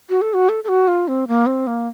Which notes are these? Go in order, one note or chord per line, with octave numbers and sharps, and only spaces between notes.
F#4
A4
F#4
A4
A4
F#4
F4
C4
A#3
C4
A#3